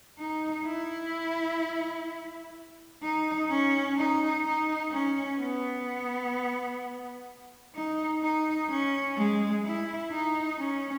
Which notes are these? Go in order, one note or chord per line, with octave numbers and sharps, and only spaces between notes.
D#4
E4
D#4
C#4
D#4
D#4
C#4
B3
D#4
D#4
C#4
G#3
E4
D#4
C#4